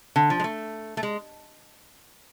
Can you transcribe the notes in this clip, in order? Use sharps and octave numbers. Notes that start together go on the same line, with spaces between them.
D3
F3
G#3
A3
A3
G#3